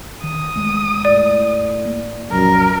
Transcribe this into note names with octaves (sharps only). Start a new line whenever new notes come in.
D#3 D#6
E2 G#3 A3
A2 D5
A#3
C2 F#2 A#2 F3 A#4